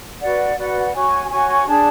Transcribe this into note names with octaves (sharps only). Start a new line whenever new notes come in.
F#4 B4 D5 F#5
F#4 B4 D5 F#5
F#4 C#5 G#5 C#6
F#4 C#5 G#5 C#6
D4 G#4 D5 A5